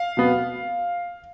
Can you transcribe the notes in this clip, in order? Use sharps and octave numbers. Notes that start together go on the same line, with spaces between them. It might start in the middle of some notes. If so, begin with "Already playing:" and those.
Already playing: F5
B2 B3